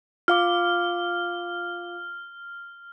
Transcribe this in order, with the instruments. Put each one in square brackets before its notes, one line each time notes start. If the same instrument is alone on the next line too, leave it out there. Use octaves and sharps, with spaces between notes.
[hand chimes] F4 F5 D6 [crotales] F6